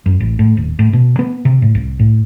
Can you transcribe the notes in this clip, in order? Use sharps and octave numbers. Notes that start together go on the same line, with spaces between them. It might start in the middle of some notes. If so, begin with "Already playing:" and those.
F#2
A1
A2
D#1
A2
B2
B3
C3
A2
C2
A2